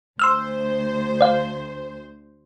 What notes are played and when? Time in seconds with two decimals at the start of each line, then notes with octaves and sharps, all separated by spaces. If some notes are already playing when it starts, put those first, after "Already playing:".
0.19 D2 C5 C6 E6 F6
1.21 D5 F5